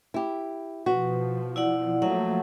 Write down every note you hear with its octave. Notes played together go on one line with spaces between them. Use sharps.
E4 G4
B2 F3 F#4 B4
E4 D5 F#5
F3 F#3 A3 A#3 F#5